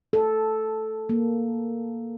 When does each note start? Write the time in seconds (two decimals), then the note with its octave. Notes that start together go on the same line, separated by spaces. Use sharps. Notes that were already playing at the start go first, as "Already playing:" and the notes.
0.13 A4
1.09 A#3